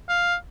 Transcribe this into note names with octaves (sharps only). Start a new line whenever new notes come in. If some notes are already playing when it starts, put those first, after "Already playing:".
F5